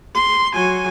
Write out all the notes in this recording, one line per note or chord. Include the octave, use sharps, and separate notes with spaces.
C6
F#3 G#5